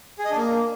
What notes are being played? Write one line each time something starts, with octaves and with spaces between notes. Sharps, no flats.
G#4
D#5
D4
A#3